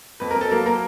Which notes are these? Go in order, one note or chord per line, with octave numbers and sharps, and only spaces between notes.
F2 B4
A#4
F2
A4
F#3 A#3 A#4
A#3 A#4